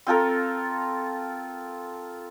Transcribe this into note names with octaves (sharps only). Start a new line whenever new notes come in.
C4 F4 A4 A#4